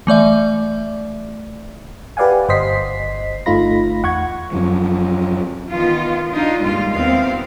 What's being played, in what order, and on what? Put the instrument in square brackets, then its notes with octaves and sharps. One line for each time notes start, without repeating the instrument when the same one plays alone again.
[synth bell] E3 A3 D5 E5
[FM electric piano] G4 B4 D5 F5 F#5 G#5
G1 C5 D#5 B6 C7
G1 A3 D#4 F4 B5 A#6
E2 F#5 C#6 G#6
[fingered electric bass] F#2 F3
[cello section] D#3 E3 B3 F4
D4 D#4 F4
G2 A#2 D#3 G3 G#3 F4
D#2 B3 C4 E4 F5